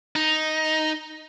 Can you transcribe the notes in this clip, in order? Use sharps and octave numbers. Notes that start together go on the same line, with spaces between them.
D#4